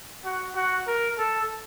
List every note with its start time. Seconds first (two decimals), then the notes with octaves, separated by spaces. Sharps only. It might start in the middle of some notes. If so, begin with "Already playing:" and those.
0.25 F#4
0.55 F#4
0.87 A#4
1.18 A4